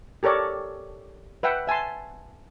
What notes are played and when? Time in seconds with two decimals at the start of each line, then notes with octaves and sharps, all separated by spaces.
0.23 G4 A4 A#4 C#5 D5
1.43 B4 E5 F#5 G5
1.67 E5 G#5 A5 C6